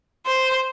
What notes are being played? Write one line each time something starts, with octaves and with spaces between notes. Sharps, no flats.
C5